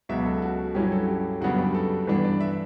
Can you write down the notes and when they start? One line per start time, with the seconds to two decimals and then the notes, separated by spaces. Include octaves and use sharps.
0.09 C#2 B2 F#3 B3 E5
0.25 A4
0.42 F#4
0.75 G2 F#3 C#4 E4 G4
0.92 A4
1.08 G4
1.41 F#2 C#3 G3 B3 D4 F#4
1.58 G4
1.74 A4
2.07 G2 E3 B3 D4 B4
2.24 D5
2.41 E5